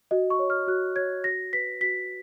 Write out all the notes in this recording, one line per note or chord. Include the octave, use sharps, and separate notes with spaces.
F#4 D#5
C#6
C#5
F6
F#4 F#6
C#5 G#6
F#4 A#6
B4 B6
F#4 B6